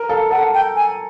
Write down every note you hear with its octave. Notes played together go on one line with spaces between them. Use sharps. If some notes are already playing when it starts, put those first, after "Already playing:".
Already playing: A#4
A4 F5
A4 F#5
G5
G#5